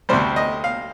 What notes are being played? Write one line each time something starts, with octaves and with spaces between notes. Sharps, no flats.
D2 C3 G3 C5
D#5
F5